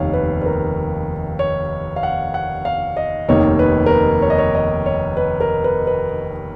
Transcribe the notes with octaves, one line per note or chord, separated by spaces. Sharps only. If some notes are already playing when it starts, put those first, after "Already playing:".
Already playing: F1 D#2 D#3 C#5 F5
B4
B4
A#4
C#5
F5
F#5
F#5
F5
D#5
F1 D#2 D#3 A#3 D#4 C#5
B4
A#4
B4
C#5
D#5
C#5
D#5
C#5
B4
A#4
B4
B4